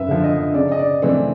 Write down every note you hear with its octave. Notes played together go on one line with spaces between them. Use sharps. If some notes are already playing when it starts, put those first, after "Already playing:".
Already playing: F#2 B4 E5
D3 F3
D#5
C#3 D5
D#5
D5
E3 A3 C4 D5